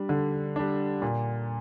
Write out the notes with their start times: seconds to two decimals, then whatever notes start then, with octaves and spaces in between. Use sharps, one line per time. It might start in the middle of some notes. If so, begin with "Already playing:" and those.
Already playing: G3 D4
0.09 D3
0.56 G3 D4
1.02 A#2